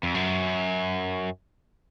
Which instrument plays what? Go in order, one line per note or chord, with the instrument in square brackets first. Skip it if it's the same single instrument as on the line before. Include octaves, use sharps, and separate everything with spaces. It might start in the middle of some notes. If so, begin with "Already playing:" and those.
[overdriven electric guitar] F2
F#2